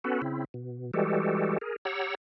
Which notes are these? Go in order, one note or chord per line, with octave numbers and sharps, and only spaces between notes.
B3 C#4 F#4 A4 B4
C#3 C4 E4
B2
E3 G3 G#3 F#4 G4 A4
G#4 A#4
G4 C#5 F#5 A#5 E6